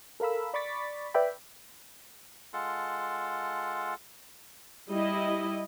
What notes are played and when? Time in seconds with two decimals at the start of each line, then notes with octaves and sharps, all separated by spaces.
0.20 A4 A#4 F5 B5 E6
0.54 D5 B5 C#6 D6 A6 B6
1.14 B4 D5 E5 G5 B5
2.53 G#3 F4 A4 F#5 A5 C6
4.90 G3 E4 D#5